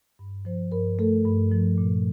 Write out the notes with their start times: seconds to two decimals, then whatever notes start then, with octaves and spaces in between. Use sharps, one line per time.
0.19 G2
0.45 F3 C5
0.72 G2 A#4
0.99 A3 A4
1.26 G2
1.52 F3
1.78 A#2